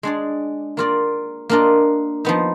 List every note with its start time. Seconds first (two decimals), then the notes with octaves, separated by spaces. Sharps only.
0.03 G#3 D4 G#4 D5
0.77 A#3 F4 A#4 D5
1.49 A#3 D4 F4 A#4 D#5
2.25 F3 B3 D#4